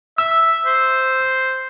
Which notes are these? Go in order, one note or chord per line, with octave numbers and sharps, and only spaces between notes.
E5 E6
C5